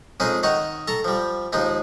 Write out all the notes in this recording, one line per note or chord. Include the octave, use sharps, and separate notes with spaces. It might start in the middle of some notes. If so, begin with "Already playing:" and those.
F2 G#3 C#4 D#4 G#4
D#3 D#4 C#5 F#5 C#6
A4 A#5 C#6
F3 G3
D#2 F3 G#3 D#4